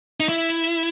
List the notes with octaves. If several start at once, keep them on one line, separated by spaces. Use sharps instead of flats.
D#4
E4